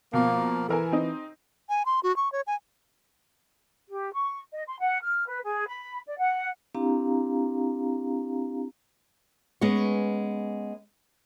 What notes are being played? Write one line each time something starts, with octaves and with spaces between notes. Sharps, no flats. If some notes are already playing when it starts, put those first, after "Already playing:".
B2 F3 A#3
E3 A4 A#4 G#5
C4 D#4
G#5
C6
F#4
C#6
C#5
G#5
G4
C#6
D#5
C6
F#5
F6
B4
G#4
B5
D5
F#5
C4 D4 E4 G4 F5 A#5
G#3 B3 C#4 C#5